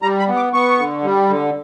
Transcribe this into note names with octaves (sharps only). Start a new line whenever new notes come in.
G3 A#5
B5
B3
D6
B3 C#6
D3
G3
D3